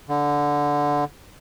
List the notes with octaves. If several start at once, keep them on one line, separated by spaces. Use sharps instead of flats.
D3